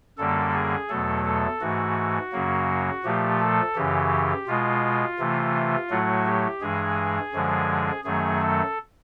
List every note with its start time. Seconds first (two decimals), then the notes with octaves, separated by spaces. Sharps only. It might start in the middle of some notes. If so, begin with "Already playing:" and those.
0.18 F#2 D3 G3 A#3 A4
0.54 G#4
0.89 E2 B2 F#3 A3 A4
1.25 A4
1.61 G#2 E3 A3 F#4
2.32 F#2 C#3 F#3 A#3
3.04 A#2 F3 A3 G4
3.40 A4
3.75 F#2 C#3 E3 G4
4.47 B2 G#3 F4
5.19 C3 E3 A3
5.90 A2 F#3 A3 F#4
6.26 G4
6.61 G2 E3 G#3 G#4
7.33 F#2 D3 F3 G#3
8.04 F#2 D#3 F#3 A3 G#4
8.41 A4